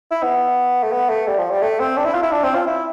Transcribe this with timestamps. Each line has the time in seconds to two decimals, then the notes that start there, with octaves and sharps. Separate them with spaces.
0.11 E4
0.23 B3
0.84 A3
0.92 B3
1.10 A3
1.27 G3
1.39 F3
1.50 G3
1.62 A3
1.80 C4
1.97 D4
2.05 E4
2.14 F4
2.23 E4
2.32 D4
2.43 C4
2.55 F4
2.67 E4